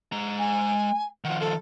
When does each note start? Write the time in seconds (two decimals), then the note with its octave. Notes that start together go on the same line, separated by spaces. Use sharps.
0.12 G#3 A#5
0.39 G#5
1.24 D#3 F3 F#5
1.40 A4